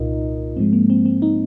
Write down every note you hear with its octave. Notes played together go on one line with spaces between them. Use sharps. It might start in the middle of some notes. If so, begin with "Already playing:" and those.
Already playing: C2 A#2 D#4 F4 A#4 D#5
G#2 F3 G#3 C4
A#3
C4
C4
D#4